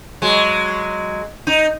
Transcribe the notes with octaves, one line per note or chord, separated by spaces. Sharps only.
F#3 G#3
D#4